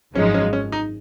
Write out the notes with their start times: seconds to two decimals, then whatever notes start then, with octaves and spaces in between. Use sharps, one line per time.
0.15 G#1 F#2 F3 G#3 C#4 D#4
0.34 C#4
0.53 C#4
0.72 D#4